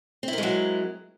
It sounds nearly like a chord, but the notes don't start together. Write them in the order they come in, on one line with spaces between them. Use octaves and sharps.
C4 E4 A#4 G#3 F#3